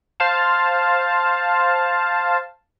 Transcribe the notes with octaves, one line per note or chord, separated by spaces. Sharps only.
C5 F5 A5